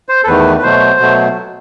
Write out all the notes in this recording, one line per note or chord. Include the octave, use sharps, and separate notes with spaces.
C5
A4
E2 D#3 A3 B4
B4
B2 F#3 A3 C5
B2 F#3 A3